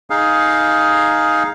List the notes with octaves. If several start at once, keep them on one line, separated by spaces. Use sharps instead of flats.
D#4 G#4 F5